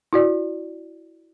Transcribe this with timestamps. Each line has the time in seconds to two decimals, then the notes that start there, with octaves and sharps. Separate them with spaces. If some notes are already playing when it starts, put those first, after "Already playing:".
0.13 E4 F#4 D5